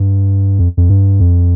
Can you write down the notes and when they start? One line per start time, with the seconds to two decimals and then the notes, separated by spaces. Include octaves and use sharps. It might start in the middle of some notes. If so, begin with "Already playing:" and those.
Already playing: G2
0.59 F2
0.77 F2
0.90 G2
1.20 F2